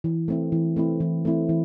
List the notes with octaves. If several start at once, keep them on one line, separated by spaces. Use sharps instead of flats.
E3
A3 C4 E4
E3
A3 C4 E4
E3
A3 C4 E4
E3